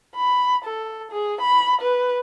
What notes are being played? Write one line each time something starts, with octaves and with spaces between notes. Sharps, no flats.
B5
A4
G#4
B5
B4